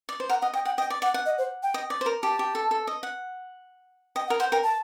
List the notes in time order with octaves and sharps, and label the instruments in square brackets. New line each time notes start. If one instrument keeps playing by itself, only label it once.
[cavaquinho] D5
C5
[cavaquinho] A#4 [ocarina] F#5
[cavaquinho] D#5 [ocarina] F#5
[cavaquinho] D#5 [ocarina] G5
[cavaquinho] F#5 [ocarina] G5
[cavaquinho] D#5 [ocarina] G5
[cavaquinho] D5
[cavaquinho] D5 [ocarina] F#5
[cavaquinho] F#5
[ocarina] D#5
C5
G5
[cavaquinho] D#5
D5
C5
A#4
[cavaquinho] G4 [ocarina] A5
[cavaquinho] G4
A4
A4
D#5
F#5
[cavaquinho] D#5 [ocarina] G5
[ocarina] F#5
[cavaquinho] A#4
[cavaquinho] C5 [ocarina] F#5
[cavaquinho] A#4 [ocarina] G5
[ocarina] A5